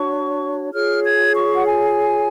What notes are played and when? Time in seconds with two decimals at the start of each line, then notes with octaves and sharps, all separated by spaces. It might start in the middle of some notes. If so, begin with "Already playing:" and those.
Already playing: D4 F#4 C#5 C#6
0.73 F4 G#4 C#5 F6
1.04 G#6
1.35 C#6
1.55 F#5
1.66 G#5